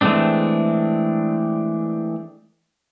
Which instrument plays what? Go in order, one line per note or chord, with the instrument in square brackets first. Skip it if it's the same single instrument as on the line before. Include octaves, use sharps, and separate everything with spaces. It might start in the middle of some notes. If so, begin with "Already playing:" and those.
[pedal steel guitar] E3 G#3 A3 C4 D4